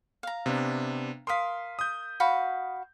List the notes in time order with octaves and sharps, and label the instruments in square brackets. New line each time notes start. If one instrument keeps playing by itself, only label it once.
[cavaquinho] F5 A#5
[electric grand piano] C3 B3 D4
[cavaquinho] A#4 F5 [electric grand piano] C6 D#6 B6
[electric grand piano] D#6 G6
[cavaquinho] F#4 F5 B5